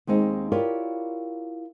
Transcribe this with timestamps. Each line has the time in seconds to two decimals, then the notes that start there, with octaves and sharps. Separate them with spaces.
0.07 D#2 G#3 C4 D#4
0.52 E4 F4 G4 A#4 C#5 D5